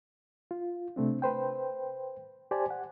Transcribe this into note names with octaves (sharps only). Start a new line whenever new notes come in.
F4
C3 A3 C4 D4
B4 C5 G5
G4 C5 D5 G#5 A5
F#5